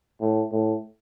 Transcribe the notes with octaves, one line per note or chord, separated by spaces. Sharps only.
A2
A2